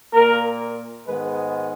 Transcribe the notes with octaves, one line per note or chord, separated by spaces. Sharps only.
A#2 A#3 A#4
G#2 D#3 G#3 B3 B4